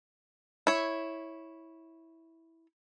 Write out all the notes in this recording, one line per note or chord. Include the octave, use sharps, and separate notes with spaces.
E4 C#5